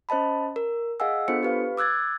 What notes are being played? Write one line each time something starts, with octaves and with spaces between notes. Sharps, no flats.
C#4 C5 D#5 A5 B5
A#4
G#4 D#5 F5 F#5 G#5 E6
B3 D4 F4 A4 C5 C#7
G4 B4 F5
D6 E6 F#6 G#6 A6